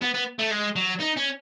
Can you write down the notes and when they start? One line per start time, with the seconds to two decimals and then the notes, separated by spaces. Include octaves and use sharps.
0.02 B3
0.14 B3
0.39 A3
0.51 G#3
0.76 F#3
1.01 D#4
1.17 C#4